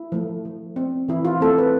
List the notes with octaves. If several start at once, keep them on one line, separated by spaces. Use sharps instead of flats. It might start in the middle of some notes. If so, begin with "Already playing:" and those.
Already playing: E4
F3 A3
F3
C4
E3 E4
F4
A3 C4 A4
B4